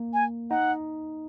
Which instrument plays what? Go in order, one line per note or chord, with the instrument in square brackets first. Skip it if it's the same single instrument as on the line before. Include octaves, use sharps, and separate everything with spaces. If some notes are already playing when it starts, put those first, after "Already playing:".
Already playing: [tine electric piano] A#3
[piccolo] G#5
[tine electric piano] D#4 [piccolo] F#5